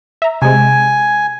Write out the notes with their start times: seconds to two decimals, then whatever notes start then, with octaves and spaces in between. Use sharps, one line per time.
0.22 E5 A#5
0.42 C3 G#3 G#5